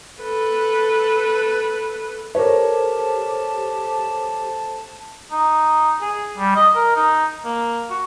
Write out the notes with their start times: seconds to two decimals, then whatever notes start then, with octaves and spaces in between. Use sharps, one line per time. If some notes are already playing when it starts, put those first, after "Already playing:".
0.21 A4 B4
2.35 G4 A4 A#4 C5 C#5 A5
5.32 D#4
6.01 G#4
6.37 G3
6.56 D#5
6.75 A#4
6.96 D#4
7.45 A#3
7.90 F#4